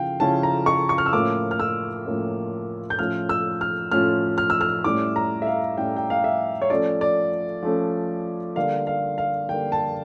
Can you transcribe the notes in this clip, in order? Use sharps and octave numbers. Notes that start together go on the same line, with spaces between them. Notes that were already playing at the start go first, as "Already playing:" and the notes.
Already playing: C#3 F3 E4 F5 G5
C#3 F3 C#4 E4 A5
A#5
C#6
C#6
F6
E6
A2 F3 A#3 C#4 F4 D6
F6
E6
A2 F3 A#3 C#4 F4
G6
A2 F3 C#4 F4 F6
E6
F6
A2 F3 C#4 F4 F6
F6
E6
F6
A2 G3 C#4 E4 D6
A#5
E5
F5
A2 G3 C#4 E4 G5
G5
F5
E5
C#5
F3 A3 C#4 D5
D5
F3 A3 C#4
D3 G3 A#3 F5
F5
F5
D3 G3 A#3 G5
A5